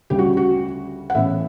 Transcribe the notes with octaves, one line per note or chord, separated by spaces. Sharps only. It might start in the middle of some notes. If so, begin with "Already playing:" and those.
D2 C#3 G3 G4
F#4
F#4
F#5
A1 A2 E3 B3 E5